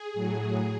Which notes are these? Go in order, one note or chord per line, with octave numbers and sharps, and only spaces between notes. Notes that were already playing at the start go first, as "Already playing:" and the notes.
Already playing: G#4
A2 F#3